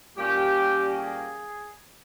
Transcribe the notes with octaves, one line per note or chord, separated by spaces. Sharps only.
A#2 G3 A#3 C#4 G4
G#4